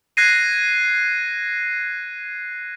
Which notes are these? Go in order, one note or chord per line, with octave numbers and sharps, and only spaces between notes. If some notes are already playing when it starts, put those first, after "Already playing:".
F#6 G#6 A#6 C7 D#7